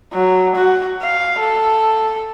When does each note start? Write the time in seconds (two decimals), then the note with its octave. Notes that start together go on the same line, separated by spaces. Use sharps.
0.13 F#3
0.55 F#4
1.02 F5
1.39 A4